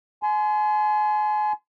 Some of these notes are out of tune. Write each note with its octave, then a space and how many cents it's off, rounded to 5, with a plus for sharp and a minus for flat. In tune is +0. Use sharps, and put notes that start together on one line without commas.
G#5 +35 C6 -25